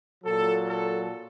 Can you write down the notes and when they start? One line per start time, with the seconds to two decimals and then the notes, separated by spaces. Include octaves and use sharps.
0.24 A#2 F#3 A4
0.68 A4